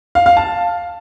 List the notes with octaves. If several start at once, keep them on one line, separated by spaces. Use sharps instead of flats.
F5
F5
A5